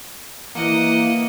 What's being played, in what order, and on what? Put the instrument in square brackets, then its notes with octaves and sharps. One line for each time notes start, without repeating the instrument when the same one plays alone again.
[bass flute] E3 [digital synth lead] A#3 [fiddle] D#5 [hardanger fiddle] F#5